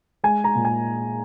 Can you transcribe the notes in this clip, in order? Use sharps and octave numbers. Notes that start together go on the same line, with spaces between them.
G#3 G#5
A#5
A#2
G#5